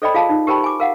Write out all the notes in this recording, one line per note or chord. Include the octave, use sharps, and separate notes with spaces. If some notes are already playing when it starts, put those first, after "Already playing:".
A4 C5 D5 D#5 G5 B5
F4 G#4 F5 A5
D#4
G4 A#4 C5 G5 A5 B5
G#5 D6
A#4 F5 F#5